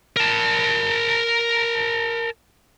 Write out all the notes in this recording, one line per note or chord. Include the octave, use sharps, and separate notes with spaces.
A#4 A5